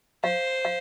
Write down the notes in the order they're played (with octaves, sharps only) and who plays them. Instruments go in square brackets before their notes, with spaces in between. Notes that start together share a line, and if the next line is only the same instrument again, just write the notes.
[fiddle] C5 [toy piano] F5
[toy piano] F5